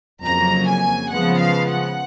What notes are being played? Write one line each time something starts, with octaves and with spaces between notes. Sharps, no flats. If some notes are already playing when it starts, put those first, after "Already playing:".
F2 C#3 F#3 A#3 A#5
G#5
C#3 F3 G#3 B3 F#5
F5
F#5